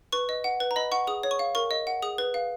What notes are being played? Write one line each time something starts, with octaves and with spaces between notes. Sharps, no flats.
B4 C#6
D#5
F#5
B4
A#5
D#5 B5
F#5 C#6
G#4 D#6
C#5
C#6
F5
A#4 C#6
D#5
F#5
G#4 D#6
B4
F5